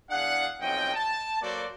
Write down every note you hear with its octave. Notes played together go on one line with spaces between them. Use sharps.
E2 D4 G#4 F5 F#5
B1 F2 C#4 D#5 G5
A5
F#3 A#3 F#4 A4 C5 D5